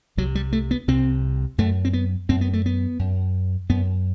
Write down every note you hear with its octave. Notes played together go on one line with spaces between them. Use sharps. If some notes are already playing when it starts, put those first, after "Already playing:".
C2 C3 F#3
G3
A3
B3
C2 C3 C4
F#2 A3
C4
B3
F#2 C4
B3
A3
B3
F#2
F#2 B3